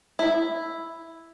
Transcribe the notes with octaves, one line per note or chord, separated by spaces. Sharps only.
E4